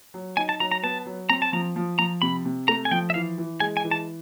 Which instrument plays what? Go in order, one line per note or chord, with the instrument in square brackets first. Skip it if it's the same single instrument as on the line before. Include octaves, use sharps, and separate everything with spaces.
[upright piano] F#3
[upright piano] D#4 [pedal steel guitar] G#5
[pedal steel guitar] A5
[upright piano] F#3 [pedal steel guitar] A#5
[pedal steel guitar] A#5
[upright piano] B3 [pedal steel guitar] A5
[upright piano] F#3
[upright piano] C4 [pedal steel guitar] A#5
[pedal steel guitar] A5
[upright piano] F3 [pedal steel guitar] A#5
[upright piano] F3
[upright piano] F3 [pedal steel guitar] A#5
[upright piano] C3 [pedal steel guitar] B5
[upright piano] C3
[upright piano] A3 [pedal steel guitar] A#5
[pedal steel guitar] G#5
[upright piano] F3 [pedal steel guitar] G5
[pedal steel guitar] E5
[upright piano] E3 [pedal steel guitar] F5
[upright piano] E3
[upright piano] G#3 [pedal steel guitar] G#5
[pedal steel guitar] G#5
[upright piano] E3
[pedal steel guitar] A5